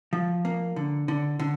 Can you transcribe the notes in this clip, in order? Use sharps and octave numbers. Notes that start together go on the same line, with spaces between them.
F3
A#3
D3
D3
D3